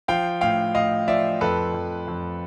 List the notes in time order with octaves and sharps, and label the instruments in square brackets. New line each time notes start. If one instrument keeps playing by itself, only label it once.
[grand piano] F3 F5 G5
A2 F5 G5
A2 D#5 F5
F3 D5 E5
F2 A4 B4
F2
F2